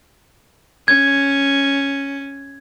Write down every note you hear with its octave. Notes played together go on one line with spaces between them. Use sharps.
C#4 G#6